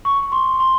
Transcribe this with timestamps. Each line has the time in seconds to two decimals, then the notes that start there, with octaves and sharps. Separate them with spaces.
0.05 C#6
0.32 C6
0.60 C6